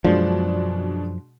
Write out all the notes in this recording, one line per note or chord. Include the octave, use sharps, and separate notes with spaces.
F#2 B2 F3 G#3 D4